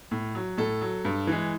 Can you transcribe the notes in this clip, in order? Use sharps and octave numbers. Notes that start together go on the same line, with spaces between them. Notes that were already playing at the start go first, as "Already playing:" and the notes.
A2
F#3
A2 A4
F#3
G2
E3 G#3